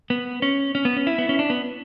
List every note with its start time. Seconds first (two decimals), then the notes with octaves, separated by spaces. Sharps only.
0.10 B3
0.42 C#4
0.75 C#4
0.85 B3
0.97 C#4
1.07 E4
1.18 B3
1.29 C#4
1.39 D4
1.50 B3